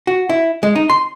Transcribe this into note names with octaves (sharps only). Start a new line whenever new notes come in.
F#4
E4
G#3
D#4
C6